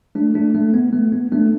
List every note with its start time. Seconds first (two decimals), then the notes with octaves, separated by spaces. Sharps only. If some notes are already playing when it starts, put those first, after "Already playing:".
0.15 A3 D4
0.34 A3 D4
0.55 A3
0.74 B3
0.93 A3
1.12 B3
1.32 A3 D4